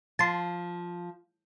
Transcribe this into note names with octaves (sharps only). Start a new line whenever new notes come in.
F3 A5 C6